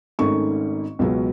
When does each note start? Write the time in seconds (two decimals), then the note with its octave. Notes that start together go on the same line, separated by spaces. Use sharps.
0.19 G#1 G#2 D#3 A3 C#4 C#6
0.99 C#2 B2 F#3 B3